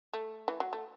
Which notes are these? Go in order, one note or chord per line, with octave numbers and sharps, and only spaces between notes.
A3
E3
F#3
A3